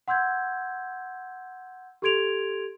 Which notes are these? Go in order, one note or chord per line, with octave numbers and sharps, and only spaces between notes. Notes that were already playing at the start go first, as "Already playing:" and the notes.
F#5 C6 E6 G6 G#6
G4 A4 C6 G#6 D7 F7